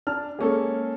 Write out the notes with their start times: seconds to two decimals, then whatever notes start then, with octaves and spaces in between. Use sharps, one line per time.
0.07 D4 A5 F6
0.39 G#3 A#3 C#4 G#4 A4